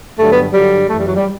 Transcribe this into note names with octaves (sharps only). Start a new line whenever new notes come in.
G2 D3 F#3 A3
B3
G2 D3 F#3 G3
F#2 E3 A3
G3
F#3
G3